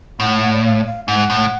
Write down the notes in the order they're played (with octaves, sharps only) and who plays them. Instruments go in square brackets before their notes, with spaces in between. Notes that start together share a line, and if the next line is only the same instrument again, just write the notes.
[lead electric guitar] A2 [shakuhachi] F#5
[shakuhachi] F#5
D5
F5
D5
F5
[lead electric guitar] G#2 [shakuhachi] F#5
[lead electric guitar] A2